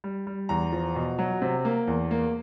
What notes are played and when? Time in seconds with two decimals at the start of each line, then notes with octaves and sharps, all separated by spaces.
0.04 G3
0.27 G3
0.49 E2 A#5
0.72 F3
0.95 B2
1.19 F#3
1.42 C3
1.65 A#3
1.87 E2
2.11 A#3